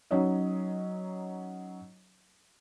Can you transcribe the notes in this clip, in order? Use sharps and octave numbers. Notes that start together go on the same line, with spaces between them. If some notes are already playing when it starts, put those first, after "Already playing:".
F#3 C#4 D#4 C#5 D#5